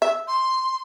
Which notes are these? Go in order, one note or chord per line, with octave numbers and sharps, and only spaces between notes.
E5
C6